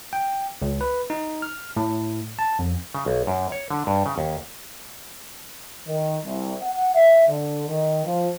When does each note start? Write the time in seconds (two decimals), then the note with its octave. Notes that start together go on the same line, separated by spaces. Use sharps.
0.13 G5
0.62 C#2
0.81 B4
1.10 D#4
1.42 F6
1.77 A2
2.39 A5
2.59 F2
2.95 C#3
3.06 B1
3.27 F#2
3.52 C#5
3.70 D3
3.87 G2
4.06 C#3
4.18 D#2
5.87 D#3
6.25 C2
6.62 F#5
6.95 E5
7.28 D3
7.68 D#3
8.05 F3